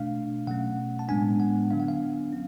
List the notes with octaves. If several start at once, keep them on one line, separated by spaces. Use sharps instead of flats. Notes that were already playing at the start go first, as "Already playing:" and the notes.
Already playing: B2 A3 D4 F5
B2 F#3 A3 C#4 F#5
A5
A2 G#3 B3 D4 G#5
F#5
D3 F#3 B3 D4 F5
F#5
F5
C#4